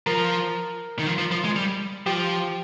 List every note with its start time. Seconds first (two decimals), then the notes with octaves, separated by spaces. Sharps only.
0.06 F3 A#4 A#5
0.99 D#3
1.07 F3
1.18 F3
1.31 F3
1.44 G#3
1.56 G3
2.06 F3 G4 G5